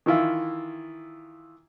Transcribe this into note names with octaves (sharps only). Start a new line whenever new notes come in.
D#3 E3 E4 F4